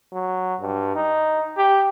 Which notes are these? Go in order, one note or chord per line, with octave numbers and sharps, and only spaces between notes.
F#3
G2
D#4
G4